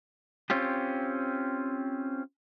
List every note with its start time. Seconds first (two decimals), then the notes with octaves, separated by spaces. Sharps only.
0.50 C4 C#4 F4 G4